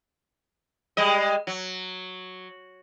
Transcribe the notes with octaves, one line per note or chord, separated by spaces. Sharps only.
G3 G#3 D#5
F#3